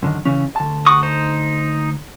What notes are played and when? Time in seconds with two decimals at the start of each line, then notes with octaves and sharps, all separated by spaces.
0.02 F#2 D3 D#3
0.25 C#3 E3 C#4
0.56 D2 A5
0.86 F#4 C#6 D#6
1.03 D#4 C5